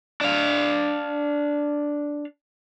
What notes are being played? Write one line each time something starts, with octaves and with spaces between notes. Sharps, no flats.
D4 F5